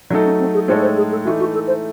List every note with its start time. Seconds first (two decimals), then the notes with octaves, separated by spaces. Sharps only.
0.10 F#3 A3 C#4 D#4 A4
0.25 C#4
0.39 C4
0.54 G#4
0.68 A2 G#3 D#4 A4 C5 C#5
0.82 C5
0.97 G#4
1.11 A4
1.25 E3 A3 D#4 F#4
1.40 F#4
1.54 A4
1.68 C5